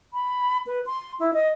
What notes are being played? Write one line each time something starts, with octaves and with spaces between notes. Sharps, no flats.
B5
B4
C6
E4
D#5